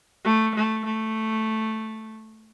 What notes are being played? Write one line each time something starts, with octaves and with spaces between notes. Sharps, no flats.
A3
A3
A3